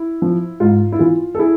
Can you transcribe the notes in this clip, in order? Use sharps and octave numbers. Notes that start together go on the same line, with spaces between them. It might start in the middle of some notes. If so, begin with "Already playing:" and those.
Already playing: E4
F3
G#2 F4
E4
E3 F4
A4
E4 G#4